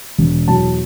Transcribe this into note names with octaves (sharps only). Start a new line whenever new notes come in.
E1
E2 B2 F#3 A5